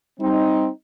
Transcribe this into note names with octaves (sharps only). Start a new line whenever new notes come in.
G3 C4 D#4